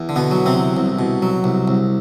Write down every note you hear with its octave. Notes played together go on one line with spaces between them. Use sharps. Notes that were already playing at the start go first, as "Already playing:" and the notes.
Already playing: E2
D3
B2 B3
F#3
C3 C4
E2
C2
B2
F#3
C2
C2